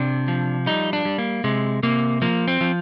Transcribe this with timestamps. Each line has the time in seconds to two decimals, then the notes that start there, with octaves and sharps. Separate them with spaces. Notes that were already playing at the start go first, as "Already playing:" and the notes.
Already playing: C3 D4
0.28 F3
0.66 G3 D#4
0.93 D4
1.05 G3
1.18 A#3
1.44 C3 G#3
1.83 C3 A#3
2.22 F3 A#3
2.48 C4
2.61 F3